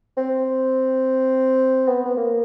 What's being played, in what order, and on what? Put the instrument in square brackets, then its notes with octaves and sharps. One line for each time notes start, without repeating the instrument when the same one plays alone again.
[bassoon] C4
B3
B3
A#3